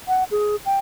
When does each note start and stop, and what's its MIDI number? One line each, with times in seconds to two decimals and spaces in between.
0.08 0.24 78
0.31 0.56 68
0.66 0.79 79